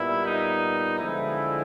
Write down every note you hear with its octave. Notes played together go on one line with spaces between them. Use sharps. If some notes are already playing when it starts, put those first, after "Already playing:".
Already playing: A#2 G3 B3 E4
D#4
D3 F3 G#3 E4